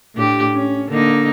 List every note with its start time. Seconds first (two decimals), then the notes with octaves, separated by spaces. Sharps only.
0.15 A2 D4 G4
0.55 C#4
0.88 D3 A#3 D#4